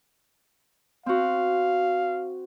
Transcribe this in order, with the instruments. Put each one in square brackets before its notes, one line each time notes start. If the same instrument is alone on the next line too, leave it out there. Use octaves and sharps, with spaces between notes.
[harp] C4 F#4 [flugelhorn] F5